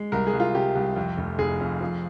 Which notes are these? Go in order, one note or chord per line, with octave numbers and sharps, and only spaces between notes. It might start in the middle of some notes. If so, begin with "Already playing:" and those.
Already playing: G#3
C2 A#4
G#4
C2
F4
C3 G4
C2
F2
F1
F1 G#4
F2
F3